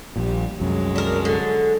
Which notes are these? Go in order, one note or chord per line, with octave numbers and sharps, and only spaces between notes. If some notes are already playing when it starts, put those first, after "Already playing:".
A#1 A#2 G3 G4
C2 F#2 F#3 G#3
D4 A#4
D3